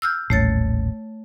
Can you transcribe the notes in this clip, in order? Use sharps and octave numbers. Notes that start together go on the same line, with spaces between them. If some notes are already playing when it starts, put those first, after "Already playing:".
E6 F6 G6
D#1 A1 A3 C#5 A6